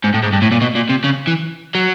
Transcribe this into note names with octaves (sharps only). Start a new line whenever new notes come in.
G#2
A2
G#2
G2
A2
A#2
B2
A#2
C3
C#3
E3
F#3